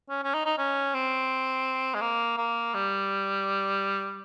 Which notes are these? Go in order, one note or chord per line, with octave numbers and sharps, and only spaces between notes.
C#4
C#4
D#4
D#4
C#4
C4
G#3
A#3
A#3
G3